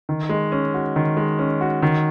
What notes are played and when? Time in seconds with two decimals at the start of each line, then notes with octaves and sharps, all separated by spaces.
0.09 D#3
0.29 G#3
0.52 C#4
0.74 F#4
0.96 D#3
1.17 G#3
1.39 C#4
1.61 F#4
1.82 D#3